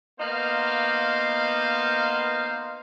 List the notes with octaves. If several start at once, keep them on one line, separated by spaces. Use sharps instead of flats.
A#3 B3 D#4 C5 F5